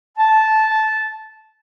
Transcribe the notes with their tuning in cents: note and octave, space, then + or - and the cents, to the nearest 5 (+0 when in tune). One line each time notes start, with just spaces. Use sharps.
A5 -10